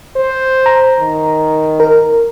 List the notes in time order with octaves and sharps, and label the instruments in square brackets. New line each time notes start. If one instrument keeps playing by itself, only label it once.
[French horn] C5
[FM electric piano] A#5
[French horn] D#3
[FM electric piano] A#4